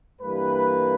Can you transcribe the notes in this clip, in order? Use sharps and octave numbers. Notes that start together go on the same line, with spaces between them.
G2 E3 G3 A#3 B4